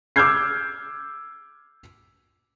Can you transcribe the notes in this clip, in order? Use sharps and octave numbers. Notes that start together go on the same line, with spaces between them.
D6 E6 F6 G6 G#6 C7